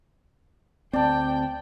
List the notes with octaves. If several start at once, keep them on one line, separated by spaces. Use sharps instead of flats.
D2 C4 D5 G5 A5